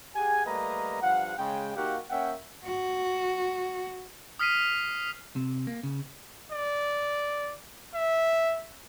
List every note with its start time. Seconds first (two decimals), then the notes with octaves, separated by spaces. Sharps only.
0.16 G4 G#4 F#5 G#5
0.46 G3 A3 A#3 B4 D#5 A#5
1.02 G2 F3 F5 F#5
1.38 C#3 G#3 G5
1.76 A#3 D#4 F#4 G4 F5 F#5
2.10 A#3 C#4 E5 F#5 G5
2.64 F#4
4.39 D#6 F6 B6 C7 D#7
5.36 C3
5.67 A#3
5.83 C#3
6.51 D5
7.94 E5